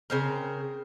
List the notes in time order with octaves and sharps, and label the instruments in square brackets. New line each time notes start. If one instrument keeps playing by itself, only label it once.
[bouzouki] C#3 C4 A#4